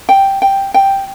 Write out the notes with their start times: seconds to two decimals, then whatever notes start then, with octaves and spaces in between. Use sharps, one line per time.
0.09 G5
0.42 G5
0.74 G5